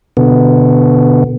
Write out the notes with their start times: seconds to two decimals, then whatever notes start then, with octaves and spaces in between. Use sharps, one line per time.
0.17 B2 D3 B3